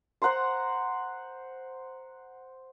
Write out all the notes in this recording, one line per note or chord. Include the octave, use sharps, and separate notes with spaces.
C5 F#5 A#5 C6